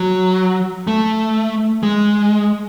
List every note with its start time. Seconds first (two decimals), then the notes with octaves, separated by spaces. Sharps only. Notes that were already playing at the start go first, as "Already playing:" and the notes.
Already playing: F#3
0.87 A3
1.83 G#3